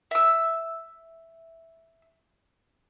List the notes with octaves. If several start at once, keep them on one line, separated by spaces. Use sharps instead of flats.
E5 E6